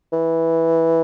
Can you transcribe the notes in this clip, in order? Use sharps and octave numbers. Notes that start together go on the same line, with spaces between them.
E3